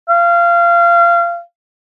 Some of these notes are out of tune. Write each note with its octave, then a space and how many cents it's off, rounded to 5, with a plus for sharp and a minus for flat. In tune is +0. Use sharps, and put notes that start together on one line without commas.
F5 -25